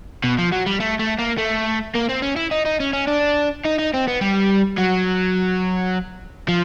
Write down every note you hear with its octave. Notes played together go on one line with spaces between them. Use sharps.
B2
F3
F#3
G3
A3
A3
A#3
A3
A#3
C4
C#4
E4
D#4
D#4
C#4
C#4
D4
D#4
D#4
C4
B3
G3
F#3
F3